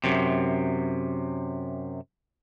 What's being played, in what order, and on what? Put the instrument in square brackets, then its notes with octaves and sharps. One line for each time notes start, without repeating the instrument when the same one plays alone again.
[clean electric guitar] F#2 C3